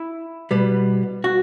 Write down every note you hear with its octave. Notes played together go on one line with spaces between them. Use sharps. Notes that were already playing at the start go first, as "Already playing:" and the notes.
Already playing: E4
B2 G3 B3
F#4